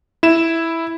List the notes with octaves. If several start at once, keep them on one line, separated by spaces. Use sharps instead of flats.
E4 E7